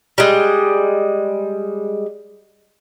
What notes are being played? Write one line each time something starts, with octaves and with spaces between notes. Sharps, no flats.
G3 G#3